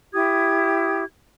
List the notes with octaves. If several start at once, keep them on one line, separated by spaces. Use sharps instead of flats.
E4 G4 D#6 G#6